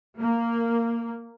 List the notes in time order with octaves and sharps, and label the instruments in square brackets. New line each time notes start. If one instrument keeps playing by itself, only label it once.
[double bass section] A#3